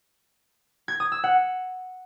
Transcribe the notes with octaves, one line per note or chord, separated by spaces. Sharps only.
G#6
D#6
E6
F#5